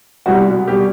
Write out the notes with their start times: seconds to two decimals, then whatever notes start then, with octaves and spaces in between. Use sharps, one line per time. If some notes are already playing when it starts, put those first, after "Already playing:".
0.26 C2 B2 G3 F#4
0.68 B2 G3 G4